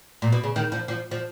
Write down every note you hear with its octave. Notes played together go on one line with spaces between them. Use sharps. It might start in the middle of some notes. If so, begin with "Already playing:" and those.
A#2
B2
C#3
D#3
F3
F3
F3